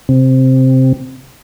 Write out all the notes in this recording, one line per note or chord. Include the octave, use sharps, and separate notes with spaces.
C3